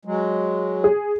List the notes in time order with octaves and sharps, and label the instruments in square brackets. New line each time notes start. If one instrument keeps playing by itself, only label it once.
[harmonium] F#3 G#3
[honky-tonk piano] G#4